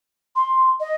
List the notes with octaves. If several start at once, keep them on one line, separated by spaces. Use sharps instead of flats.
C6
D#5